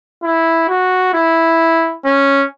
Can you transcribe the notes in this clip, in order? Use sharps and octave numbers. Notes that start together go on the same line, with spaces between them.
E4
F#4
E4
C#4